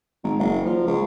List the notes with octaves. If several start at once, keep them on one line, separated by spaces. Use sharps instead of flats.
G#1
F#1
F3
C#2